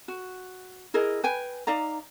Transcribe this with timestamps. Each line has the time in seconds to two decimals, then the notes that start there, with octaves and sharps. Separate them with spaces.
0.08 F#4
0.94 E4 G#4 A#4 D#5
1.23 B4 G5 G#5
1.67 D#4 D5 F5 A#5